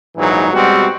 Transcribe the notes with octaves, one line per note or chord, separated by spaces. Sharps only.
A#1 G#2 E3 F#3 D#4
B2 G3 G#3 C4 F#4